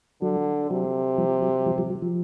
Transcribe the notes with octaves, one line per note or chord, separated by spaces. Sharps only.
D3 F#3
C3 F#3
F3 G3
F#3
F3 G3
F3 G3
F#3
F3